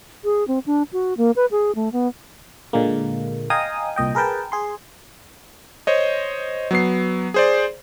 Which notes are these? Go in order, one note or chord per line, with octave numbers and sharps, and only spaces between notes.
G#4
C4
D4
F#4
A#3
B4
G#4
A3
B3
A#2 D3 G#3 A#3
D#5 F5 G5 G#5 A#5 D#6
C2 A#2 D#5 G5
G#4 A#4 B4 G5 A5
G#4 C6
C5 C#5 D#5
F#3 B3 C7
G#4 C5 D5